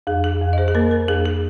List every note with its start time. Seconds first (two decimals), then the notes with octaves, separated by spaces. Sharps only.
0.07 F2 G#4
0.24 G#4
0.41 F2
0.53 D#5
0.58 G#4 C5
0.68 G#4
0.75 A#3 A#4
0.91 A#4
1.08 F2 G#4
1.26 G#4